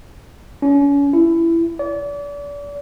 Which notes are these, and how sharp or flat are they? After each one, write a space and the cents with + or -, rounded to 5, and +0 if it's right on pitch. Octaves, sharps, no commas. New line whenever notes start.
C#4 +35
E4 +15
D5 -35